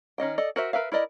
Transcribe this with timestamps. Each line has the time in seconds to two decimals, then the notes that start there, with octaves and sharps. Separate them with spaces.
0.18 D#3 C#4 D#5 G5
0.38 A4 D5 D#5
0.56 F#4 A#4 C5 E5
0.73 A#4 B4 E5 F5
0.92 E4 A#4 D5 D#5